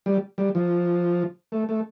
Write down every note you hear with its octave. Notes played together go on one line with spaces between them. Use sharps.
G3
G3
F3
A3
A3